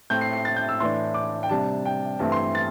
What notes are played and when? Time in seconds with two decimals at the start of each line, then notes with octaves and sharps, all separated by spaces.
0.10 A2 A3 C4 G6
0.21 C7
0.33 C7
0.45 A6
0.56 G6
0.69 E6
0.80 A2 E3 A3 D4 C6
1.14 D6
1.43 G5
1.49 C3 G3 D4 A5
1.86 G5
2.19 G2 E3 A3 C4 A5
2.32 C6
2.55 A6